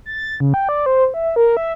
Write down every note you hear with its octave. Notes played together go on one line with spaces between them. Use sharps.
A6
C#3
G5
D5
C5
E5
A#4
E5